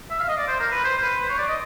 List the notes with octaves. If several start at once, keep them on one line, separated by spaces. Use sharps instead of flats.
E5
F5
D#5
D5
C5
A#4
B4
C5
C5
B4
C5
C#5
D5
D#5